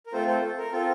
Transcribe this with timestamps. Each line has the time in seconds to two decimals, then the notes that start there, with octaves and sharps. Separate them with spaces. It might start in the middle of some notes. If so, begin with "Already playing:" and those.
0.06 A#4
0.13 A3 C4 F4 A4 C5
0.28 A4 C5
0.43 A4
0.58 A#4
0.72 C4 F4 A4